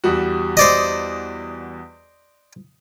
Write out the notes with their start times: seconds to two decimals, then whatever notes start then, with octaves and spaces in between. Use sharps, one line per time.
0.04 E2 G3 F#4
0.57 C5 D5 D#5